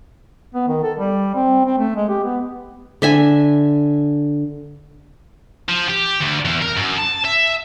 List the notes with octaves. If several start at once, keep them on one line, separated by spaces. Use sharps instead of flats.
B3
D#3
A4
G3
C4
C4
A3
G#3
G4
B3
D3 E5 G#5
F3
G4
D2
E2
A#4
F#2
A5
E5